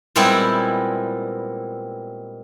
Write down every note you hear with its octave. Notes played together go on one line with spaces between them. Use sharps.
A#2 G3 G#3 B3 C4 E4